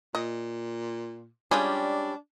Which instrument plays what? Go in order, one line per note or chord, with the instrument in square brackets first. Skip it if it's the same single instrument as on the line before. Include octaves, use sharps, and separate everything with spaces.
[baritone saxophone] A#2 [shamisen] D#5
[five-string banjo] G3 C#4 G4 [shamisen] G#3 F4 G#4 [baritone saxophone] D4